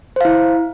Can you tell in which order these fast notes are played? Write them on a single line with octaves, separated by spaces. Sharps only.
C5 F5 E4